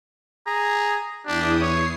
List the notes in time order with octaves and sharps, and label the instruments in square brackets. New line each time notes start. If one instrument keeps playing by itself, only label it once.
[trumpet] G#4 [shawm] A#5
[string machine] E2 E4 D#6 [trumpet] D4 [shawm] G4
[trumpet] C#5 [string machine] C7